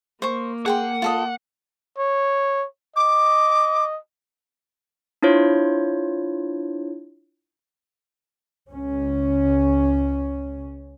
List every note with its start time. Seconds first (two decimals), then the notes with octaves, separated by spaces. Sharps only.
0.22 A#3 C5 C#6
0.66 G#4 F#5 G5 C6
1.02 F4 A4 D#5
1.98 C#5
2.96 D#5 D6
5.23 D4 E4 F4 C5 C#5
8.70 C#2 C#4